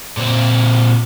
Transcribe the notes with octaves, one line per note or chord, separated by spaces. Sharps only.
A#2 C4